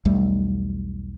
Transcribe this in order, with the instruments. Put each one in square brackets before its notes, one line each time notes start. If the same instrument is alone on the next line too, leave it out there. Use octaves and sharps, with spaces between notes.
[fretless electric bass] B1 E2 G3 A3